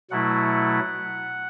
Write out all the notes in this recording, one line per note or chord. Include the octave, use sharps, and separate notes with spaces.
B2 F#3 A3 E4 F#5